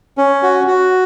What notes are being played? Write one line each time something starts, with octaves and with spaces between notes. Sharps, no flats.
C#4
F#4
F#4